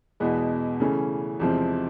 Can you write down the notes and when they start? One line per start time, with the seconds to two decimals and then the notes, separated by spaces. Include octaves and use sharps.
0.20 E2 B2 G#3 B3
0.80 C#3 E3 A3 C#4
1.40 E2 C3 F3 G#3 C4